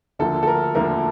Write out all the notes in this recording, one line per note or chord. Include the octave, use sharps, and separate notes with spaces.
D2 D3 F3 A#3 A4
A4
A#4
D2 D3 F3 A#3 A#4